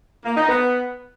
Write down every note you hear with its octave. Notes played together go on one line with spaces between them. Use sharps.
A#3
D#4
B3